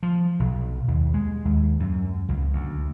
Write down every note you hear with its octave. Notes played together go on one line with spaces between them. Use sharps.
F3
B1
D#2
G#3
D#2
F#2
C#2
D2